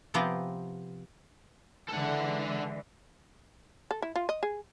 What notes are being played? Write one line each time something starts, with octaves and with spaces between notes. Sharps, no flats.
C3 F3 B3 C4 G4 A#5
D3 E3 G#3 A4 F#5
A4
E4
F4
D#5
G#4